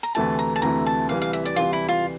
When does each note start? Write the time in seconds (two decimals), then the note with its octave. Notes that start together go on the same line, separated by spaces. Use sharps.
0.03 A#5
0.15 D2 C3 E3 A3 E4 A5
0.39 A#5
0.56 A5
0.62 D2 C3 E3 A3 E4 A#5
0.86 A5
1.09 C3 E3 G3 F5
1.22 F5
1.33 E5
1.45 D5
1.56 C3 E3 G3 F4
1.73 E4
1.88 F4